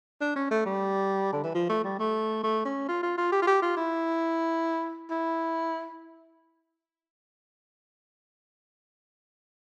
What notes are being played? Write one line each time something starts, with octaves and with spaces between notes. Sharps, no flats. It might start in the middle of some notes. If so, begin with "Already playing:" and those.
D4
C#4
A3
G3
D3
E3
F3
A3
G3
A3
A3
C#4
F4
F4
F4
G4
F4
G4
F4
E4
E4